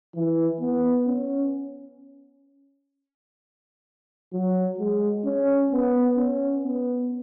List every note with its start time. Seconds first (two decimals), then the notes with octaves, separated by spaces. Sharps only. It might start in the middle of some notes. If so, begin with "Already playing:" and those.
0.15 E3
0.61 B3
1.07 C#4
4.33 F#3
4.79 G#3
5.25 C#4
5.72 B3
6.17 C#4
6.64 B3